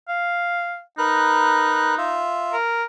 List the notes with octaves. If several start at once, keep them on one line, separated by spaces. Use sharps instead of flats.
F5
D#4 A#4 B4 F#6
F4 E5
A#4